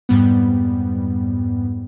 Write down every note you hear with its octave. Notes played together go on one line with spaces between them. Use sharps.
F2 G#2 G3 B3